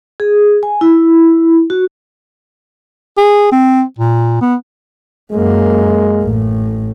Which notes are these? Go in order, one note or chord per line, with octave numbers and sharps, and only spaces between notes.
G#4
G#5
E4
F#4
G#4
C4
A#2
B3
F#2 G#3 A#3
A1 A2